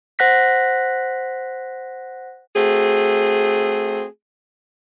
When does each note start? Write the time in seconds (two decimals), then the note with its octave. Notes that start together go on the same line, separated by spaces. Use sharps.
0.19 C5 F#5 F#6 A#6 B6
2.56 A3 C4 F#4 G#4